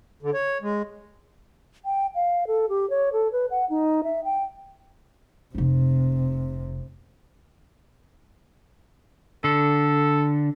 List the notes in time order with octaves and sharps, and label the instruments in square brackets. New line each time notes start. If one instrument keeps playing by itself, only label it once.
[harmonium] D3
C#5
G#3
[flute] G5
F5
A4
G4
C#5
A4
B4
F#5
D#4
E5
G5
[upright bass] F1 C4 [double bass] C3
[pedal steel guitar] D3 [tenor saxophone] A4